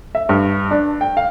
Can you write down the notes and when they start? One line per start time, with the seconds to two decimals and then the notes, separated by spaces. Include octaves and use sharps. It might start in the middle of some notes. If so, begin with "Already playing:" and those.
0.15 E5
0.29 G2
0.71 D4
1.01 G5
1.17 F5